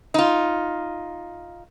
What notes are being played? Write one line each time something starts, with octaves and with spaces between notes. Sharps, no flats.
D#4 F4